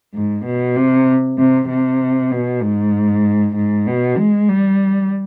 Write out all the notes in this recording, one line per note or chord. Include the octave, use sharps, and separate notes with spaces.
G#2
B2
C3
C3
C3
B2
G#2
G#2
B2
G#3
G3